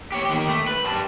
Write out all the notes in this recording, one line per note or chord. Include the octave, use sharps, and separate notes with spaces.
G4 C#5
D#3 G4
A3
B4
G3 A5